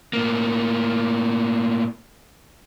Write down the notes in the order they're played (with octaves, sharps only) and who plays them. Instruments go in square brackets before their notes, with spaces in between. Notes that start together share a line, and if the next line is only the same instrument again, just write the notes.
[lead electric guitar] A2 A#3